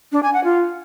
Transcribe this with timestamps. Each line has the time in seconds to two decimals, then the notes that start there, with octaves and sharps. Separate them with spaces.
0.12 D4
0.23 G#5
0.34 F#5
0.44 F4